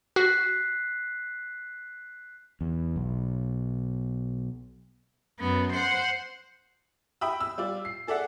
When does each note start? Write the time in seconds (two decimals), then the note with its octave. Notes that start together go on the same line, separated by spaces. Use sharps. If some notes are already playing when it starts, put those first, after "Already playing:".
0.16 F#4 F#6 B6 C7
2.61 E2
2.96 B1
5.40 F#2 B3
5.73 C5 F#5
7.21 E5 G5 B5 D#6 E6
7.40 E6
7.58 G3 F4 D5
7.85 C7
8.07 G#4 A4 D5 E5 F#5